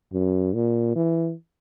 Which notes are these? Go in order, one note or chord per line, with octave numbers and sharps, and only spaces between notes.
F#2
A#2
E3